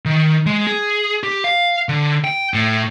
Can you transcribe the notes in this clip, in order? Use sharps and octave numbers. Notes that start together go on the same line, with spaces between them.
D#3
G#3
G#4
G4
F5
D3
G5
A2